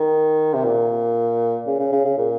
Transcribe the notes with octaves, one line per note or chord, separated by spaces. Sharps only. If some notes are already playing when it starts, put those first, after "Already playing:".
Already playing: D#3
C3
A#2
C#3
C#3
C#3
C#3
A#2